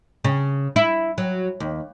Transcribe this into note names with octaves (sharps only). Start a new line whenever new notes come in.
C#3
E4
F#3
D#2